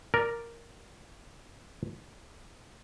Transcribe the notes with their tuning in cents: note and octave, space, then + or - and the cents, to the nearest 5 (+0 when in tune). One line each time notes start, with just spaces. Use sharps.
A#4 +0 D5 +0